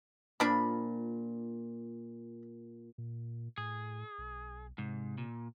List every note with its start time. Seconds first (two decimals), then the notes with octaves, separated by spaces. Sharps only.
0.40 A#2 F3 D4 B5
2.98 A#2
3.58 A2 G#4
4.18 B1
4.78 G#2 C3
5.18 A#2